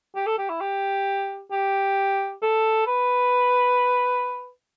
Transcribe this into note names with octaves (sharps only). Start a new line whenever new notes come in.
G4
A4
G4
E4
G4
G4
A4
B4